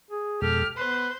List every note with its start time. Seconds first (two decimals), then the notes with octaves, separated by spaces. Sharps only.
0.11 G#4
0.42 F2 B2 G#3 G4 A4 F6
0.78 B3 B4 C5 C6